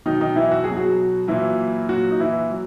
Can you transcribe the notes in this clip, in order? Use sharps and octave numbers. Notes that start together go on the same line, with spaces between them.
B2 D#3 F#3 D#4
D#3 D#4
E3 E4
F#4
F#3 G#4
B2
F#3 F#4
A#2 E3 F#3 E4
A#2 F#3 F#4
D#4
E3 E4
F#3